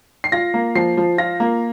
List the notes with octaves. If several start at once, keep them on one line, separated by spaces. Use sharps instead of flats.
C7
F4 A#6
A#3
F3 C7
F3
F4 A#6
A#3